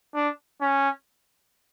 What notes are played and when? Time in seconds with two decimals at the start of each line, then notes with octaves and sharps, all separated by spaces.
0.15 D4
0.61 C#4